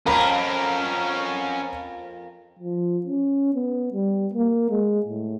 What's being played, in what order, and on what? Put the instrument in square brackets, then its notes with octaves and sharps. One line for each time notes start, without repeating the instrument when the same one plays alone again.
[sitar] F2 A#3 [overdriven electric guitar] C#4 A#4 [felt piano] A#5 B5
[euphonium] F3
C#4
B3
G3
A#3
G#3
A2